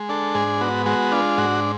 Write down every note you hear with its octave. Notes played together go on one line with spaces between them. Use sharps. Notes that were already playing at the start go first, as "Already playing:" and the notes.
Already playing: G#3
D4 A4
G#2 G#4
B3 F#4
G#3 F#4
D4 F4
G#2 F#4